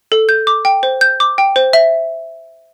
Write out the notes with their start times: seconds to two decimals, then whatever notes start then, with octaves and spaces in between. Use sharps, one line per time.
0.12 A4
0.29 G6
0.47 D6
0.65 G5
0.83 C5
1.01 G6
1.20 D6
1.38 G5
1.56 C5
1.73 E5